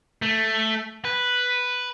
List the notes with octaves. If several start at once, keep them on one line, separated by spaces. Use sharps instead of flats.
A3
B4